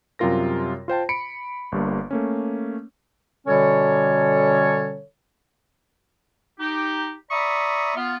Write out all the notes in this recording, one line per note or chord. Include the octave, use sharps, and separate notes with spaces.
F#2 C3 G3 F4 A#4 A#6
F4 C5 G5 A5
B5 C#7 D7
G1 G2 A#3
A3 A#3 C#4
B2 D3 G3 C#4 A4 C#5
D#4 G4
D5 E5 A#5 B5 C#6 D#6
B3 F4